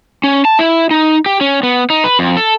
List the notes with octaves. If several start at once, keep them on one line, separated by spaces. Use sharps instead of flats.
C#4
A5
E4
D#4
G4
C#4
B3
D#4
B4
F2
A4